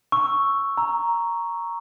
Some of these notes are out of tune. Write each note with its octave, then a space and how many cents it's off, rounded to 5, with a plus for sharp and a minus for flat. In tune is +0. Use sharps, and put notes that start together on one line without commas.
C#6 +0 E6 +0
A#5 +0 E6 +0